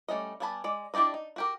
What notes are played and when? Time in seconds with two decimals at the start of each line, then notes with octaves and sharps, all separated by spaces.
0.09 G3 A3 C#4 D#5
0.40 G3 B3 G#5 A5 B5
0.64 G#3 D5
0.94 D4 E4 G4 D5 D#5
1.14 D#4
1.36 F#4 G4 A#4